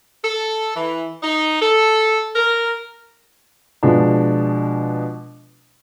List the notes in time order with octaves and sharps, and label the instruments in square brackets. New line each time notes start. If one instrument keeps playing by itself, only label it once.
[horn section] A4
E3
D#4
A4
A#4
[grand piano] B2 F3 G#3 D4